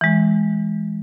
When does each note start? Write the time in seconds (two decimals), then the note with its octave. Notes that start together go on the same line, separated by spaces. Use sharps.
0.01 E3 G#3